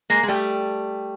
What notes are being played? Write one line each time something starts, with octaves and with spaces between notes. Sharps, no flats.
G#3 A#3
G#3
G3 A3